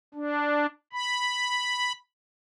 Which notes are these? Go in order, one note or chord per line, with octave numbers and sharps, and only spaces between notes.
D4
B5